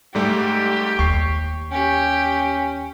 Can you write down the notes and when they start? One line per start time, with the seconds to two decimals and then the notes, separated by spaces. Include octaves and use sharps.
0.15 G#2 G3 A3 G4
0.99 D#2 C#6 C7
1.71 C#4 G4